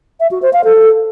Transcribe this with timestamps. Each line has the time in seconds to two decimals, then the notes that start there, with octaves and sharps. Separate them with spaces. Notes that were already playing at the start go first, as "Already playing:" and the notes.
0.20 E5
0.31 F#4
0.42 C5
0.53 F5
0.64 A4